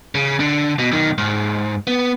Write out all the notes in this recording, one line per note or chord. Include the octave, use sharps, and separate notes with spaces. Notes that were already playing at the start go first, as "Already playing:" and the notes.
C#3
D3
B2
B1 D#3
G#2
B3